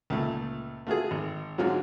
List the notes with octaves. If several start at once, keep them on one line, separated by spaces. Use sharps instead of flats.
C#2 A#2 A3
A3 F4 F#4 G#4
G#1
G#2 D3 F#3 G#3 F4 F#4